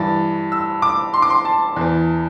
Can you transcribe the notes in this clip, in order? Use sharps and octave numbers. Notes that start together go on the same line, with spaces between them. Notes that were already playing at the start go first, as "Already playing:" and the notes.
Already playing: G2 E3 A6
E6
D6
C6
D6
C6
A5
E2 E3